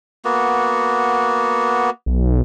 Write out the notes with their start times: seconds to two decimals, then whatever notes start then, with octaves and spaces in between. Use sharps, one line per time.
0.25 A#3 B3 F#4
2.06 B1